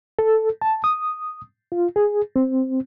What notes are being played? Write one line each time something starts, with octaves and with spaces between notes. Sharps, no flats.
A4
A5
D#6
F4
G#4
C4